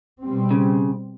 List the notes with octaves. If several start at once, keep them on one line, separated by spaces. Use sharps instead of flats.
B2 G3 C4
C#3